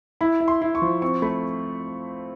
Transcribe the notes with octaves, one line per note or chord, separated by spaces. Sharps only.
E4 B5
E4
C6
E4
C#6
F3
C4 C#6
A3 B5